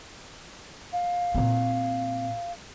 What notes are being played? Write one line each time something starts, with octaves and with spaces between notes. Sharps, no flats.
F5
A#2 C4